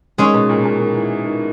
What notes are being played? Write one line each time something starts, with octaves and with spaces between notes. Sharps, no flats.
D#3 G#3 C#4 G#4 C#5
B2
A#2
A#2
D#3
E3
D#3